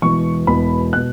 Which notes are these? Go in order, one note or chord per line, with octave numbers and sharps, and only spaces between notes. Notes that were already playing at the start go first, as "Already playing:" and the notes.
E1 E2 B2 C#6
E1 E2 B2 B5
B2 F#6